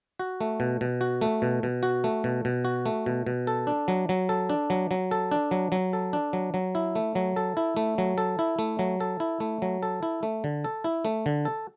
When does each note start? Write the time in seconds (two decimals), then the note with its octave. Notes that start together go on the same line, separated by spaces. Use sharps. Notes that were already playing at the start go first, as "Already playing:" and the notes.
0.20 F#4
0.41 A3
0.60 B2
0.81 B2
1.01 F#4
1.21 A3
1.42 B2
1.63 B2
1.83 F#4
2.04 A3
2.24 B2
2.45 B2
2.65 F#4
2.86 A3
3.06 B2
3.26 B2
3.47 A4
3.67 D4
3.88 F#3
4.09 F#3
4.29 A4
4.50 D4
4.70 F#3
4.91 F#3
5.11 A4
5.32 D4
5.51 F#3
5.72 F#3
5.93 A4
6.13 D4
6.33 F#3
6.54 F#3
6.75 E4
6.95 A3
7.15 F#3
7.36 A4
7.57 E4
7.77 A3
7.98 F#3
8.18 A4
8.39 E4
8.59 A3
8.79 F#3
9.00 A4
9.20 E4
9.40 A3
9.62 F#3
9.83 A4
10.03 E4
10.23 A3
10.44 D3
10.64 A4
10.84 E4
11.05 A3
11.26 D3
11.45 A4